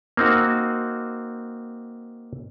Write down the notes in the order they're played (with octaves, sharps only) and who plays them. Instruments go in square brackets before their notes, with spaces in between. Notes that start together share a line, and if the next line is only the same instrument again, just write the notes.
[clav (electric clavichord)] A#3 C4 D#4 F#4